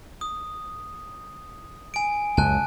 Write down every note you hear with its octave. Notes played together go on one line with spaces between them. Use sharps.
D#6
G#5 D7
C#2 F#2 G#5 A5 F#6